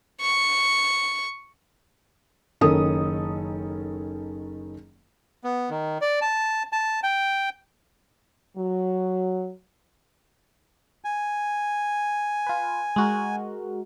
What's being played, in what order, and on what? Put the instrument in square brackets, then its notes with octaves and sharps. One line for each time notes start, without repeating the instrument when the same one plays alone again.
[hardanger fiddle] C#6
[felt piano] F#1 D#3 C#4 A4 D#6
[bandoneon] B3
D#3
D5
A5
A5
G5
[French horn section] F#3
[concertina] G#5
[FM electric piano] F4 B4
G#3 F#4 A#4